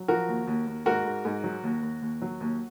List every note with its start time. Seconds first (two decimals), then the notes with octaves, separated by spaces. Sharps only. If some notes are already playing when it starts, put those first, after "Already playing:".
Already playing: F#3
0.08 F3 F#4 A#4
0.28 D#2
0.47 D#2
0.67 D#2
0.86 G#2 F#4 A#4
1.05 G#2
1.25 G#2
1.44 F#3
1.63 D#2
1.83 D#2
2.02 D#2
2.22 F#3
2.41 D#2